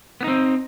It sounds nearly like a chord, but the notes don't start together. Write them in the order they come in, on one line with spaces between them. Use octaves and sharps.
B3 D#4 C4